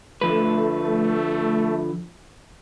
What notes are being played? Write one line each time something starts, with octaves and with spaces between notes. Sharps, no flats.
D3 F3 A3 B4